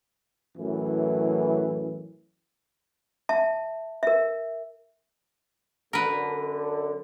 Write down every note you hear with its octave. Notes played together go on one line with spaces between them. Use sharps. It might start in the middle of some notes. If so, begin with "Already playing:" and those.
F#2 A2 E3
E5 A5
A#4 E5
F#2 D3 A#4 B4